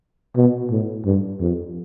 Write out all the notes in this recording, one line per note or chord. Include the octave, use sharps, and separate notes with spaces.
B2
A2
G2
F2